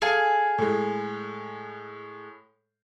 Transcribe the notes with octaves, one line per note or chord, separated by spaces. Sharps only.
G#4 A4 F5 G#5
A2 G#3